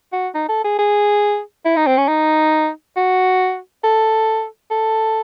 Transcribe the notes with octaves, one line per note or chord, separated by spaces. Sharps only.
F#4
D#4
A4
G#4
G#4
E4
D#4
C4
C#4
D#4
F#4
A4
A4